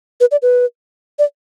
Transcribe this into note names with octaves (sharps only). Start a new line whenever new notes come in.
B4
D5
B4
D5